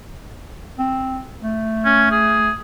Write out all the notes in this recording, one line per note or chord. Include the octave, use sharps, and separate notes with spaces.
C4
A3
C#4
G#4